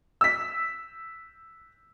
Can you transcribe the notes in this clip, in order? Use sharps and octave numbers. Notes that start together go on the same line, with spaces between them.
E6 B6